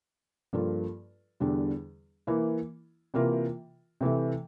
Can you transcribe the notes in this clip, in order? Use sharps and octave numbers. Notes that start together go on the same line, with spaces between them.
G2 F3 A#3 F4 A4
E2 D3 G3 D4
E3 A#3 E4
C3 E3 A#3 F4 A#4
C3 E3 A3